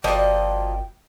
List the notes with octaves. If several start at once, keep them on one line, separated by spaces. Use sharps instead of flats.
G1 F3 G3 A#3 F#4 D5 D#5 G5